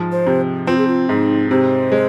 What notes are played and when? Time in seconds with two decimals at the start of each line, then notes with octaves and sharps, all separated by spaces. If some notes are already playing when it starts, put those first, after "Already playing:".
Already playing: G#2 F3
0.12 C5
0.26 C3
0.67 C4 F4
0.78 G#4
0.88 F4
1.09 G#2 D#4
1.50 C3 C5
1.92 G#3